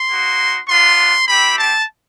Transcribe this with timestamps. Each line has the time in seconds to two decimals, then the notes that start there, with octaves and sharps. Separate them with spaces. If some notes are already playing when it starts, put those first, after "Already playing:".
Already playing: C6
0.10 A#3 D#4 F#4
0.68 B3 D4 F4 C6
1.27 C4 E4 G4 B5
1.56 A5